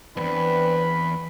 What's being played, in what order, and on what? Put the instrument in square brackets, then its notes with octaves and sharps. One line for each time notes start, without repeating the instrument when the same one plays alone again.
[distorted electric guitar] E2 G2 [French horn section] C4 D4 B4 [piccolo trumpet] B5